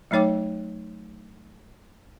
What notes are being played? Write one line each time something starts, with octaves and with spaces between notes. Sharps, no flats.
F#3 A3 D#4 C#5 G5 D6